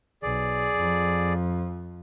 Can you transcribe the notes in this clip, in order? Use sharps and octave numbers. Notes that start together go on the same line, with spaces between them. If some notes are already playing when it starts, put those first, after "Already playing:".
B1 G#4 D5
F2 F3